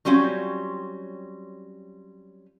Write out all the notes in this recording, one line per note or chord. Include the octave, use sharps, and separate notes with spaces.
F#3 G3 C4 C#4 F4